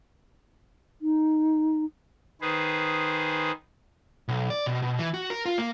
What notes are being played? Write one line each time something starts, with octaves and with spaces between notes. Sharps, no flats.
D#4
D#3 G#4 B4 C5
B1
D5
B2
B2
E3
F#4
A#4
F4
A#3